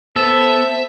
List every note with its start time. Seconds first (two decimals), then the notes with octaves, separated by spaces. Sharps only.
0.16 B3 A4 C5 E5